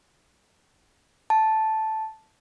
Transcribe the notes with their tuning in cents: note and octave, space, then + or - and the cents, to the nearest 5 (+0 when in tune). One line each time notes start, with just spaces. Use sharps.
A5 -5